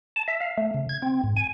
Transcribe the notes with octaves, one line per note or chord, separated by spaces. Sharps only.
A5
E5
F5
A3
C#3
G#6
C4
G#2
G#5